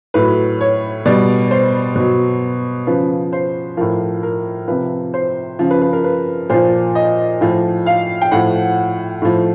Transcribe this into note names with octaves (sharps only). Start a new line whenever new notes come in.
A2 F#3 B4
C#5
B2 G3 D5
C5
B2 F#3
C#3 F3 B4
C5
A2 F3 A#4
A#4
C3 F3 B4
C5
C#3 F3
B4
B4
A#4
B4
A#2 F3 C5
D#5
A2 F3
F5
G5
A2 F3 F#5
A2 F3